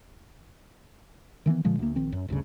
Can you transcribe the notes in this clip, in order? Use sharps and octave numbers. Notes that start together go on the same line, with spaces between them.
D#3 E3 G#3 B3
A#2 D3 F3 G#3
D2 A#3
A#1 D#3 C4
F#2
G1 D2 G2 C#3